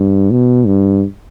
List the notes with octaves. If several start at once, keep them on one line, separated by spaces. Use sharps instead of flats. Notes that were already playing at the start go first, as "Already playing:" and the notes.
Already playing: G2
B2
G2